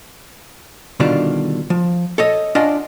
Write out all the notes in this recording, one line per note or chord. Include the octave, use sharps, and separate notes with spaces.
B2 D3 D#3 G3 D4 F4
F3
A4 C#5 D#5
C#4 D4 F4 D5 D#5 F#5